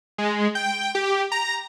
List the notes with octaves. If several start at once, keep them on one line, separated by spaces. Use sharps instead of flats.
G#3
G5
G4
A#5